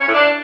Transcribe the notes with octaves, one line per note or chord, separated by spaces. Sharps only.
C#4
A2
D4